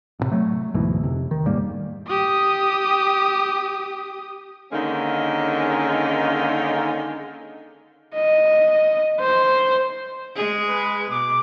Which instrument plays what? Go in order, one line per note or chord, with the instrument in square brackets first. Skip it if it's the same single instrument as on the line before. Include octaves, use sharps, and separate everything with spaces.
[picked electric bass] A1 A2 C3
F#3 A3
D2 G#2 B2 E3
F2 C3
D#3
D#1 G#2 G3 A#3
[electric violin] G4 D#6
[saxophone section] D3 D#3 G#3 A#3 C#4 D#4
[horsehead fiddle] D#5
C5
[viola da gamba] G#3 G#4
[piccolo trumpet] B4
[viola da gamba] B2 [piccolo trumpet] D6